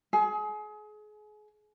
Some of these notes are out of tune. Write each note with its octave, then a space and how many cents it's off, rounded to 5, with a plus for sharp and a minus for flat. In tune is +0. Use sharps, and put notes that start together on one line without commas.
G#4 +30